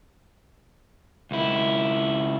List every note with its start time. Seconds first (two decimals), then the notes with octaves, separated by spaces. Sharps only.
1.31 C#2 E4